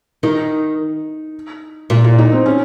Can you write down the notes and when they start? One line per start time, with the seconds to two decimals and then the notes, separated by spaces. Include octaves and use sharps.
0.23 D#3 D#4
1.90 A#2 F4
2.04 F4
2.18 D#4
2.32 C4
2.46 C#4